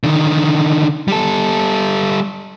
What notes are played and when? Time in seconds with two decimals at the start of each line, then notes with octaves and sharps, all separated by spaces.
0.04 D3 D#3
1.08 G3 A4